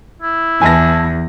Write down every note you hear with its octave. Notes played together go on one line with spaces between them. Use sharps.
E4
E2 G#5 A5 A#6